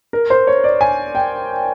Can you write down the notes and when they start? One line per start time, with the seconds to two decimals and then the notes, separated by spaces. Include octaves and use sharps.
0.13 A#4
0.30 C5
0.47 C#5
0.64 D5
0.81 G#5
1.15 G5